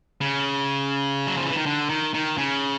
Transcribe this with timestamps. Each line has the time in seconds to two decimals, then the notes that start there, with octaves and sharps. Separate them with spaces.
0.21 C#3
1.27 F#3
1.37 F3
1.46 E3
1.56 D#3
1.66 D3
1.89 D#3
2.14 D#3
2.37 C#3